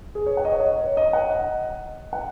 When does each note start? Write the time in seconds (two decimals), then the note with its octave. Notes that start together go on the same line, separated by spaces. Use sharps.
0.15 G#4
0.26 C#5
0.37 F#5
0.45 D#5
0.52 C#5
0.60 D#5
0.81 C#5
0.97 D#5
1.13 F#5
1.30 D#5
2.13 F#5